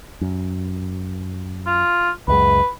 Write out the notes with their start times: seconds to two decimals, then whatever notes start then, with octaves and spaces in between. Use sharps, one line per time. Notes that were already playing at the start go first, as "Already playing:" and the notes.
0.21 F#2
1.67 F4
2.28 C#2 F#2 G#3 B4